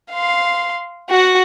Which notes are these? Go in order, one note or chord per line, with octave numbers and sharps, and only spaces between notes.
F5 C6
F#4 F#5